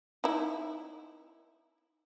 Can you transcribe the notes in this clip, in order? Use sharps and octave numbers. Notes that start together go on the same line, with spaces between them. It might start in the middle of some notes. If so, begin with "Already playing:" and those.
D#4 E4